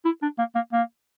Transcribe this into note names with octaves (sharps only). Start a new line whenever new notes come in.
E4
D4
A#3
A#3
A#3